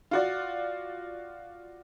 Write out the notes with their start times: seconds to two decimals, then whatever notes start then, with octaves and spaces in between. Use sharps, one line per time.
0.11 F4 F#4 D5